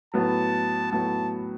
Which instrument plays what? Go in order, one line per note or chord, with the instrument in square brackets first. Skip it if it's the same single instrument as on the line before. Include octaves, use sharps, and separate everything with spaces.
[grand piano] A2 F#3 B3 [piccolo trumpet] A5
[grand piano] A2 F#3 B3 [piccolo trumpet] A5